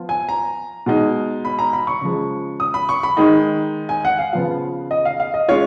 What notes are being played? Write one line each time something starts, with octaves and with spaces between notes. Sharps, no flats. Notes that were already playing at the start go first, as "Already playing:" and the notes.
Already playing: F3 B3 F4
G#5
A#5
B2 G#3 D#4
B5
A#5
B5
C#6
C#3 F3 G#3
D#6
B5
C#6
B5
D#3 G#3 D#4
G#5
F#5
F5
C#3 F3 B3 F4 F5
D#5
F5
F5
D#5
G#3 C#4 F4 C#5